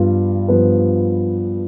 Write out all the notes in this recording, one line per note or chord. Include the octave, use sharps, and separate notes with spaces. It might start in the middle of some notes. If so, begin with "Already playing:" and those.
Already playing: G2 F3 B3 F4 B4
G2 F3 B3 F4 B4